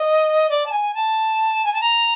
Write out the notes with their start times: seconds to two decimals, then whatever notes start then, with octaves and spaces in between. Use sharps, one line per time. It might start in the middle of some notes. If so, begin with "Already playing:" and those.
Already playing: D#5
0.49 D5
0.66 A5
0.71 G#5
0.94 A5
1.65 G#5
1.73 A5
1.81 A#5